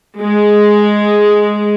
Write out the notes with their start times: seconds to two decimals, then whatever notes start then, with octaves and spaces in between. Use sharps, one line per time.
0.20 G#3